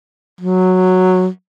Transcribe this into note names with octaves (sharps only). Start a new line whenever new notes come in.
F#3